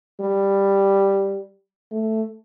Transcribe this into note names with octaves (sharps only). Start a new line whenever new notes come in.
G3
A3